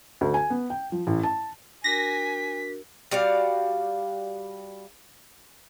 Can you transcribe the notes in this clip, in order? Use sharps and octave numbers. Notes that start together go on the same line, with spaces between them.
D2
G#5
B3
G5
F3
A1
A5
D4 F#4 A#4 G#5 A#6 B6
G3 F#4 D5 F5